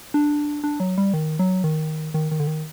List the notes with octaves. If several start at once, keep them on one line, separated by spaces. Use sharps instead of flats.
D4
D4
F#3
G3
D#3
F#3
D#3
D#3
D#3
D3
D#3